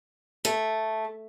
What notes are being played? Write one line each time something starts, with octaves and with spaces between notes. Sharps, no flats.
A3